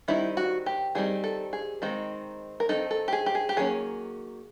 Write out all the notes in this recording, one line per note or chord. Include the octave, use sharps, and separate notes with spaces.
D#3 G3 C4 D#4 E4
F#4
G4
D#3 G3 C4 D#4 G#4
A4
G#4
D#3 G#3 C4 D#4
A#4
D#3 G#3 C4 D#4 A4
A4
G4
G#4
G4
G#4
G4
D#3 F#3 A#3 C#4 G#4